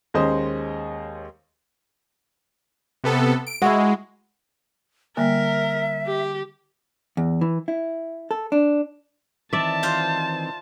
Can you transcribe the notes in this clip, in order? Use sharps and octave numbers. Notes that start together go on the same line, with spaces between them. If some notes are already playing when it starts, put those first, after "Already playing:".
D#2 G#3 C#4 C5 D#5
C3 B3 A4
D7
G#3 E4 F#4
D3 G3 A#3 A#4 E5
G4
E2
E3
E4
A4
D4
D#3 E3 C4 D5 E5 A5
F4 C5 F5